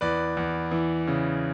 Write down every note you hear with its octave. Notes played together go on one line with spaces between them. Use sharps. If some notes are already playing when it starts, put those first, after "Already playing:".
E2 B4 D5
E2
E3
C#3